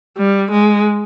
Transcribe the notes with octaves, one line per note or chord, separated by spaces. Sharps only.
G3
G#3